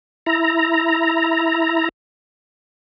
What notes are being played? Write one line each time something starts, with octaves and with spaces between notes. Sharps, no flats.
E4 A#5